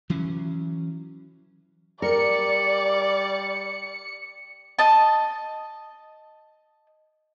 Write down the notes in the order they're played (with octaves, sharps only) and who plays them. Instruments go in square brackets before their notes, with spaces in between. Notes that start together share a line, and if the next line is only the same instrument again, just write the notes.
[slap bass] E3 F#3 C#4
[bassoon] G3 [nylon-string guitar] A#4 [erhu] D5 [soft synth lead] C#7
[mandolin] D#5 A5